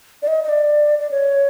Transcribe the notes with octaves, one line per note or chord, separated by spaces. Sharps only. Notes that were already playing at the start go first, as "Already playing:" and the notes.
D5
D#5
D#5
D5
D5
C#5